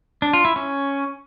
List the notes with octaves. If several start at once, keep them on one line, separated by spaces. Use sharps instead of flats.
D4
F4
E4
C#4